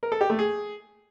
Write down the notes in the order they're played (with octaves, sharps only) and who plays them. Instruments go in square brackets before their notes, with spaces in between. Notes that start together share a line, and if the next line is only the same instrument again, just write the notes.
[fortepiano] A#4
A4
G4
A3
G#4